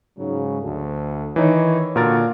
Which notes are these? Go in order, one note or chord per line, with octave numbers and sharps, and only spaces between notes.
G#2 C#3 F#3
D2 A4
D#3 E3 D#4 C#5
A#2 D3 F#4 A#4 A6